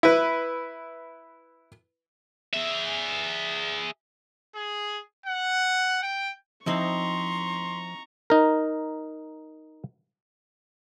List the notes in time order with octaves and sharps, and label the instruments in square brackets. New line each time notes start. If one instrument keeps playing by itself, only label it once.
[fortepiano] E4 B4
[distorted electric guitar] G#4 E5
[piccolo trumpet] G#4
F#5
G5
[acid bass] F3 [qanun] C4 D#4 E4 [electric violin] A#5 C#6 [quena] C6
[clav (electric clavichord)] D#4 A#4